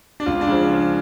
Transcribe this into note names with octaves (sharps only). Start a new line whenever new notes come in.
D4
C#2 F4
D4
C#3 F3